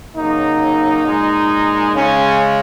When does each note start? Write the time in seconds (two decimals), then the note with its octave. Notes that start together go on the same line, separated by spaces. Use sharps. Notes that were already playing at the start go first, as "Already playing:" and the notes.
0.16 C#3 F#3 A#3 D#4
1.05 A#2 G#3
1.95 C#3 G#3 C#4